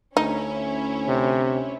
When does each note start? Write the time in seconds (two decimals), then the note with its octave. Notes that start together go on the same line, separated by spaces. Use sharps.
0.17 D2 C#4 D#4 E4
1.08 C3